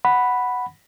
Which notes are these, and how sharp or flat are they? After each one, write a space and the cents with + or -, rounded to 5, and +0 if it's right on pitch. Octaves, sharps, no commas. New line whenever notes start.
F#5 +0 B5 +0